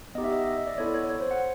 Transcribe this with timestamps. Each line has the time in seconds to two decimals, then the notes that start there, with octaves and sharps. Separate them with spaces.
0.15 B3 D#4 G4 D#5
0.24 E5
0.32 D#5
0.42 D#5
0.46 E5
0.58 D#5
0.67 D5
0.78 B3 E4 A4 C#5
0.94 C#5
1.09 C#5
1.20 C5
1.31 F#5